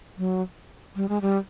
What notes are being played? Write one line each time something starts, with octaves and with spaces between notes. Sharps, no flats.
F#3
G3
G#3
G3